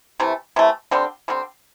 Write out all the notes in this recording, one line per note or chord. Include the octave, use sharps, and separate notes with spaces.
C3 E3 A3
C3 E3 A3
D3 G3 C4
D3 G3 C4